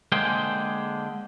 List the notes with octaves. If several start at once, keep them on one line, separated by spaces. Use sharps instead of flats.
D3 G#3 A#3 G#4 C5 G5